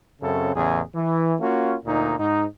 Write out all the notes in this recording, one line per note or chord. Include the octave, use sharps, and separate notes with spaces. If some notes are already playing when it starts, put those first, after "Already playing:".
F#2 C#3 C4 A4
A1 E2 C#3 G#4
E3
A#3 C#4 F4 F#4
D2 A#2 D#4
G#2 D#4